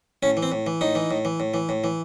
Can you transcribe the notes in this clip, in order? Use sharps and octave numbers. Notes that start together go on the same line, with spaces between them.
A2 C#4
E3
C4
A2
E3
A2 D#4
E3
A2
E3
A2
E3
A2
E3